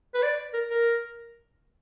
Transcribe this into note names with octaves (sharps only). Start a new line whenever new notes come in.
B4
D5
A#4
A#4